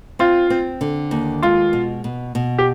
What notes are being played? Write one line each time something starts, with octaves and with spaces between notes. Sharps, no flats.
C4 F4
C4
D3
D#2
G#3 F4
B2
B2
B2
G4